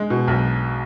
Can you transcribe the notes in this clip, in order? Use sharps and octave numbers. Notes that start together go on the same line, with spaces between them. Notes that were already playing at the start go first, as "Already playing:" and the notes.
Already playing: G#3
B2
B1